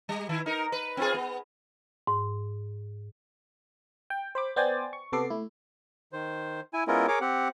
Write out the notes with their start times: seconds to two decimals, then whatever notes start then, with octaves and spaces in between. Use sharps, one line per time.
0.09 G3
0.29 D#3 E4
0.46 D#4 A#4
0.72 B4
0.97 C4 F4 G#4
1.14 B3
2.07 G#2
4.10 G5
4.35 C5 B5 D6
4.56 B3 C5 D5 G5 G#5 A6
4.93 C#6
5.12 C3 B3 A4 D6 C7
5.30 A3 E4
6.13 D#3 C5
6.73 E4 G#5
6.88 G#3 B3 C#4 E4 F4 A#4
7.08 G#4 A#4 C#5 D6
7.21 C4 G4 F#5